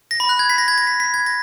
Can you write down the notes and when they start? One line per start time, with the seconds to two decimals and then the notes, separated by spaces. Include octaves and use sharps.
0.11 A#6
0.20 B5
0.29 F#6
0.39 G#6
0.50 B6
0.58 A#6
0.68 G#6
0.78 A#6
0.87 B6
1.00 B6
1.14 G#6
1.26 A#6